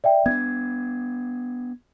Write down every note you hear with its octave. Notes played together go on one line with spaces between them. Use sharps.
D5 E5 G5
B3 C#4 D4 G#6